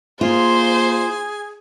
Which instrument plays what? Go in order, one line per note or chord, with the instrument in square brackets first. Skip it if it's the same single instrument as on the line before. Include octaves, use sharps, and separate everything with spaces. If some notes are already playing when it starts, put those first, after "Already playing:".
[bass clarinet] A#3 [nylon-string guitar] F4 [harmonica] G#4 [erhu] C5